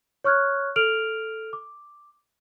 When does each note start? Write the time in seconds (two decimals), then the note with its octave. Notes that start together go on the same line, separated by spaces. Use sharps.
0.24 C#5 C#6 F6 F#6 G#6
0.76 A4 F6 D7 F7 F#7
1.53 D6